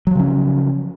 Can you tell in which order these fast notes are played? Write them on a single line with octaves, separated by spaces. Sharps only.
F#3 F3 C#3 C#4